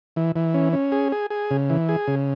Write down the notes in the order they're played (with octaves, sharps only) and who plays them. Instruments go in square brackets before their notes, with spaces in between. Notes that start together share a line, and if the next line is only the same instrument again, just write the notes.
[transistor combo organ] E3
E3
C#4
C#4
G#4
G#4
G#4
C#3
E3
G#4
C#3